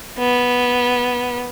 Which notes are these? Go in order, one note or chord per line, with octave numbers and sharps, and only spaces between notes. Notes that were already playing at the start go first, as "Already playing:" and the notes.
B3